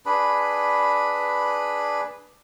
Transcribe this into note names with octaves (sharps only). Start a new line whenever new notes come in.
D4 G#4 B4 B5